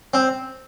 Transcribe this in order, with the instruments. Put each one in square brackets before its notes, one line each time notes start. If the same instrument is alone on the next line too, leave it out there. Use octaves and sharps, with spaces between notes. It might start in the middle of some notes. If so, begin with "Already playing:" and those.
[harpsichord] C4